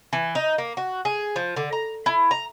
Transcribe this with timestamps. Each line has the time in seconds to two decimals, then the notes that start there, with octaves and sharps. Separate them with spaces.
0.13 E3
0.35 D#4
0.58 A#3
0.77 F#4
1.05 G#4
1.36 F3
1.56 D3
1.73 A#5
2.06 E4
2.31 A#5